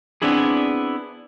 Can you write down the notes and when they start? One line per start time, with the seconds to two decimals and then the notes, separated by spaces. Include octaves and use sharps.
0.22 B3 C4 D4 E4 G#4